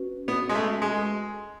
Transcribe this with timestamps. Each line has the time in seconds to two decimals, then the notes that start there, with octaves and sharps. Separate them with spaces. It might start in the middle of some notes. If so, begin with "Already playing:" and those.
Already playing: C#4 F#4 B4
0.28 B3
0.49 G#3
0.55 A3
0.82 G#3